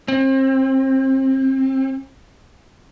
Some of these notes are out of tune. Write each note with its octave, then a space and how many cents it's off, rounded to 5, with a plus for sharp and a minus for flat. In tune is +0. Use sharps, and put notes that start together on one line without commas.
C4 +30